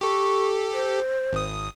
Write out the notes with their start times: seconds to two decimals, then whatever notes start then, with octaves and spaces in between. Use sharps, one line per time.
0.01 G4 A4 C#6
0.73 C5
1.33 G#1 D#6